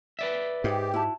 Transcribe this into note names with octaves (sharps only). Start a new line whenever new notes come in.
B4 D5 E5
G#2 G4
E4 F#4 A5